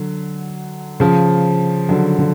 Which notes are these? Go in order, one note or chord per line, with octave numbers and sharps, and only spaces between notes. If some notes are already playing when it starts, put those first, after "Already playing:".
Already playing: D3 F#3
C#3 F3
D3 F#3
D3